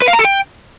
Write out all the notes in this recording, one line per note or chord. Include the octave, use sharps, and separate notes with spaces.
B4
F5
A#5
A4
G5